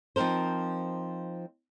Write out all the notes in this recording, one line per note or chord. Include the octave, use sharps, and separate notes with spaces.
F3 C4 D#4 A#4 C5